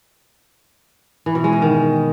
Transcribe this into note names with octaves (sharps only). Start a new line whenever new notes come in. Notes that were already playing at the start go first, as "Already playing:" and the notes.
E3
B2
G#3
B2
D#3